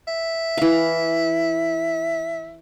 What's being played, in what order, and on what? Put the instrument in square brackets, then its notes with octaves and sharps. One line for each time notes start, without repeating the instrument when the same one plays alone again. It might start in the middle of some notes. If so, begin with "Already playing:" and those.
[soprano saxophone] E5
[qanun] E3 F5